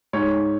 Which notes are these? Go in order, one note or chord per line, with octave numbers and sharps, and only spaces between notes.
G#2 C#5